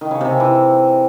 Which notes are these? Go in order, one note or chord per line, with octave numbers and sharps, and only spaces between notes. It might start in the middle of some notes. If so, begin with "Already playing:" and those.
D#3
C#3
C3
C4
E3